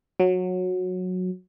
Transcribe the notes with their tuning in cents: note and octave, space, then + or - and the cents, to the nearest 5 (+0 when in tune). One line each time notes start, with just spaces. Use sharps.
F#3 -15